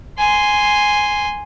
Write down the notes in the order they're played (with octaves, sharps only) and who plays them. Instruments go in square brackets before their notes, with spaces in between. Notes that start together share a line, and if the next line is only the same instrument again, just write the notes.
[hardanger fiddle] G#5 C6